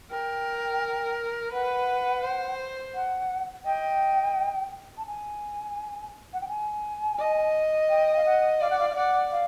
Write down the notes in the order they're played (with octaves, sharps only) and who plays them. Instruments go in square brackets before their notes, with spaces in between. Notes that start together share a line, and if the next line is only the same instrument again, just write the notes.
[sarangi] A#4 [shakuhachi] G5
[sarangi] B4 [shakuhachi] F#5
[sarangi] C5
[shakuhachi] F#5
[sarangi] D#5 [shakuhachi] G5
[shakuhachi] A5
G#5
F#5
G5
G#5
[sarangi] D#5
[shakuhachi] G5
F5
F#5
[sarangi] D5 [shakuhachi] F5
[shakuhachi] F#5
F5
F5
[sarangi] D5 [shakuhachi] F#5
[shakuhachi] F5